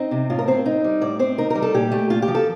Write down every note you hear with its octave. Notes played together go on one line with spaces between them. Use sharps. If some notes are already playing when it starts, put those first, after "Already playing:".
Already playing: C4 D#4
C3
A2 F4
A#4
C4 C5
D#4
G3
A2 D5
C4 C5
D#4 A#4
A#4
G3
A4
A#2 G4
A3
A#2 F4
G4
F3
A4